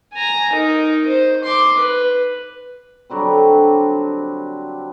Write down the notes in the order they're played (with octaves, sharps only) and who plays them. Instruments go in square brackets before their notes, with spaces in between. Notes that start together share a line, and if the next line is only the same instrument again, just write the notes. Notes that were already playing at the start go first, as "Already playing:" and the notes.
[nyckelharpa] G#5 A#5
D#4 A#4
C5
C6 D6
B4
[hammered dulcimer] D3 F#3 G3 C4